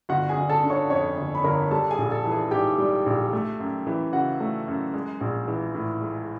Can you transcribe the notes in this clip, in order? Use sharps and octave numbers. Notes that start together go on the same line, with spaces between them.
G1 F#4 F#5
G#4 G#5
G1
A4 A5
D3
C#5 C#6
F2 C#5 C#6
G1
B5
G1 A#4 A#5
G3 A4 A5
G#4 G#5
A#1
A4 A5
E3
G#4 G#5
G#2 G4 G5
G3
A#1
A3
F#2
E3
C#3 F#4 F#5
A3
F#2
G#3
A#1
E3
A2
G#3